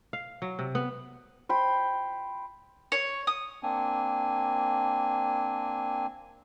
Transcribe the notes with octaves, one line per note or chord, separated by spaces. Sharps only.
F5
F#3
C3
B3
C5 G5 B5
C#5
D#6
A#3 C4 D4 G#5